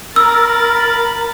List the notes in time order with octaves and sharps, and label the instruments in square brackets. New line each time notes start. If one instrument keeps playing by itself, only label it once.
[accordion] A#4 [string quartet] B5 A6 [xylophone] E6